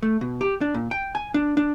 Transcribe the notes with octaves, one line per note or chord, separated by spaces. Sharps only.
A3
B2
G4
D4
A#2
G5
G#5
D4
D4